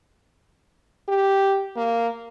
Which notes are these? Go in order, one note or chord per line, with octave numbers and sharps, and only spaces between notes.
G4
A#3